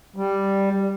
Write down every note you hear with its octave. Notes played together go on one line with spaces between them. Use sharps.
G3